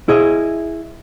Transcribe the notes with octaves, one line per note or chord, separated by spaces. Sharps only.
E4 G#4 D#5